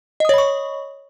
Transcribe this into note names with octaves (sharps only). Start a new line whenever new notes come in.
C#5 D#5 B5 C#6 D#6